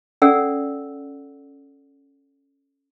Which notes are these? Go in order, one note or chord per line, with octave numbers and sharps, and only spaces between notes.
C#4 G#4 A4 D5 F#5 E6